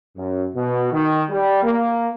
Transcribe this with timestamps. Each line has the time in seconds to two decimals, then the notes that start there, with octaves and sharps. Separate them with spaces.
0.17 F#2
0.55 B2
0.92 D#3
1.30 G3
1.62 A#3